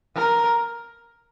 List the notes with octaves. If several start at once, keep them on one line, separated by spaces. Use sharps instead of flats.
A#4